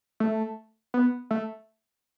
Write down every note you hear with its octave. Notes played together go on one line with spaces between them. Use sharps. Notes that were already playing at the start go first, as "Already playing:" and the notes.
A3
B3
A3